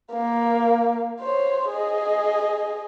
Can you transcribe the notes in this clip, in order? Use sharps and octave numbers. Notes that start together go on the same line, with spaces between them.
A#3
C5 C#5
G#4 D#5